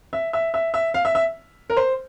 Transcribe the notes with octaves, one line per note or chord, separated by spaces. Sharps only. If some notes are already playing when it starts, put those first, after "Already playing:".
E5
E5
E5
E5
F5
E5
E5
A#4
C5